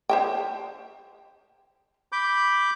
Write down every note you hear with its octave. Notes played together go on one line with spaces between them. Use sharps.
C5 E5 G5
B5 D6 G6